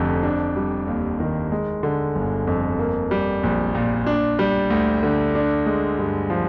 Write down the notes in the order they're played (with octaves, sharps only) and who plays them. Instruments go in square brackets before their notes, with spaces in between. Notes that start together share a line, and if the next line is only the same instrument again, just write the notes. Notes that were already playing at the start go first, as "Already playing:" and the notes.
Already playing: [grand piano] F1 F2 D3
D4
G3
D#2
D#3
G#3
D3
G1
F2
A#3
G3
A#1
A#2
D4
G3
D2
D3
D4
G#3
G2
F3